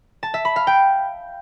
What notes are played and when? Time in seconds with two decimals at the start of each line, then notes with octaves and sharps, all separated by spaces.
0.23 A5
0.34 E5
0.45 B5
0.56 F5
0.67 G5